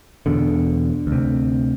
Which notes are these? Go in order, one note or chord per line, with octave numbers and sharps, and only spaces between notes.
E2 B2 D3
D2 C3